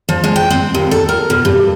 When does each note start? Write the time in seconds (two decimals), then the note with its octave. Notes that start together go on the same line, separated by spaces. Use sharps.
0.09 F3
0.24 G#3
0.36 G5
0.50 C4
0.74 D#2
0.91 A4
1.09 A#4
1.30 B2
1.45 G2